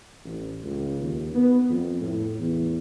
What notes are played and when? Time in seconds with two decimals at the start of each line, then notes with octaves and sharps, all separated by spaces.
0.24 A1
0.63 C#2
1.01 D#2
1.34 B3
1.69 F2
2.00 A2
2.38 E2